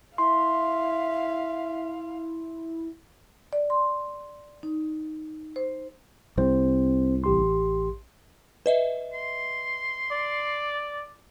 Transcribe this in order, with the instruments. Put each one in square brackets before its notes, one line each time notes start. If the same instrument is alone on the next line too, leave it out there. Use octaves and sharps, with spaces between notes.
[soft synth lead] E4 [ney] E5 [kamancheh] F5 [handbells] C6
[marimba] D5
C6
D#4
C5
[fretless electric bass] C2 [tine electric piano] C4 C5
[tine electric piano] A1 G4 C6
[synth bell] B4 D#5 E5
[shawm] C6
[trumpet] D5